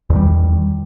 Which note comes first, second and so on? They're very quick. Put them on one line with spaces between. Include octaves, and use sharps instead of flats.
E2 D#3 G3